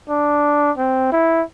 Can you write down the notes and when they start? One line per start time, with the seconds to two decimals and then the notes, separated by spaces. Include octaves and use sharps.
0.09 D4
0.78 C4
1.12 E4